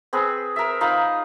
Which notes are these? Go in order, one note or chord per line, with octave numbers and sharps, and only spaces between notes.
C4 G#4 B4
A#4 E5
D#4 F4 F5 B5